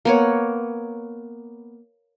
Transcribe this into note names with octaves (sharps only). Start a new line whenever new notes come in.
A#3 B3 C#5